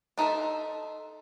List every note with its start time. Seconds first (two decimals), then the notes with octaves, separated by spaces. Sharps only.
0.18 D4 D#4 A4 C5 E5